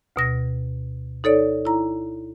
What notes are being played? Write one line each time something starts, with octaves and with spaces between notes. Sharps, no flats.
D2 B2 A#6
D#4 A4 C#5 D5
E4 A#5